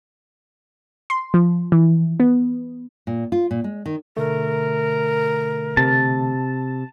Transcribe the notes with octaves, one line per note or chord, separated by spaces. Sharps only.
C6
F3
E3
B3
A#2
F4
A#2
G#3
D#3
B2 D3 A3 A#4
C3 A5